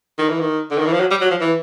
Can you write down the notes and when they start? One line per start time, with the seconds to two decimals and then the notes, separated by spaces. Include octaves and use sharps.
0.18 D#3
0.29 E3
0.40 D#3
0.71 D3
0.78 D#3
0.86 E3
0.93 F3
1.00 F#3
1.11 G3
1.21 F#3
1.31 F3
1.41 E3